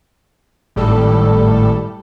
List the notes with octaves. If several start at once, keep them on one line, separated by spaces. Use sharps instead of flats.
G#1 A2 G3 A4